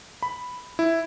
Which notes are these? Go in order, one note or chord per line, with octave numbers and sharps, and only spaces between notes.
B5
E4